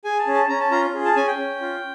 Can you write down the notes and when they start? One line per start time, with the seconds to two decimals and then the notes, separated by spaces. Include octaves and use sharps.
0.04 G#4 G#5
0.19 A5
0.27 C#4
0.34 A5
0.49 C#4 A#5
0.60 A5
0.71 F4 A#5
0.94 G#4
1.05 A5
1.16 C#4 G#5
1.27 G5
1.39 C#4
1.61 F4